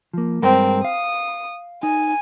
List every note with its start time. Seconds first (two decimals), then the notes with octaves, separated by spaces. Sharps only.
0.14 F3 A#3
0.43 G2 G#3 C4 A#4
0.85 F5 D#6
1.83 D#4 G#5